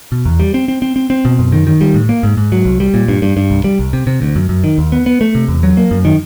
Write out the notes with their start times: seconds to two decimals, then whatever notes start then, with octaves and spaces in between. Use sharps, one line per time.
0.12 B2
0.26 E2
0.40 G3
0.54 C4
0.68 C4
0.82 C4
0.96 C4
1.10 C4
1.25 B2
1.39 F#2
1.52 D#3
1.67 D#3
1.81 G3
1.94 A2
2.09 A#3
2.23 G#2
2.37 G#2
2.52 F#3
2.65 C2
2.80 G3
2.94 A#2
3.08 G2
3.22 G2
3.37 G2
3.50 C2
3.64 G3
3.79 C2
3.93 C3
4.07 C3
4.22 D2
4.36 F#2
4.49 F#2
4.64 D#3
4.78 D#2
4.92 B3
5.06 B3
5.21 A3
5.35 C3
5.48 E2
5.63 F#3
5.77 A#3
5.91 F#2
6.05 D#3